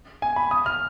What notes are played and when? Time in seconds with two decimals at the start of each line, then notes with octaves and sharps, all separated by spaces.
0.22 G#5
0.36 B5
0.51 D#6
0.66 F6